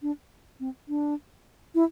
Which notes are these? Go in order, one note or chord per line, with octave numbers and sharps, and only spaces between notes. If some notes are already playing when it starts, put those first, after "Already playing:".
D4
C4
D4
E4